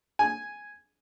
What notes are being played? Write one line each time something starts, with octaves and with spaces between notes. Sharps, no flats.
G#5